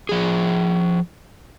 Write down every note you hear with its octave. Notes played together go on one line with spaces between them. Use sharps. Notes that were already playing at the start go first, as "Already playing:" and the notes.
F3 G#4